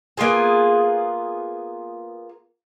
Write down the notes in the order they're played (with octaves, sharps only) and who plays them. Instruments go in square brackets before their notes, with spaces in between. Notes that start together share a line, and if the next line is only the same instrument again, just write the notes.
[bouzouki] A#3 B3 F4 G#4